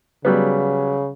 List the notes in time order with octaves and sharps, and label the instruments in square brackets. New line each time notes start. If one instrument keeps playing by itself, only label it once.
[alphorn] C#3 [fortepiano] F#3 G3 B3